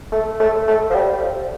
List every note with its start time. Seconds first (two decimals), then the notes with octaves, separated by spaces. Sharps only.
0.12 A3
0.40 A3
0.68 A3
0.90 F3
0.95 G3
1.21 F3